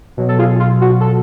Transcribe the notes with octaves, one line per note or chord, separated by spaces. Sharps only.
B2 F#3
A4
F4 G#4
F4
F#4
A4